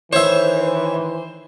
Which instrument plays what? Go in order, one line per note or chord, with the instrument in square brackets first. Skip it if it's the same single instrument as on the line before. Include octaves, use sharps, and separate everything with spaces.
[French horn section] D#3 E3 [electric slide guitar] C5 [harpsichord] C#5 E5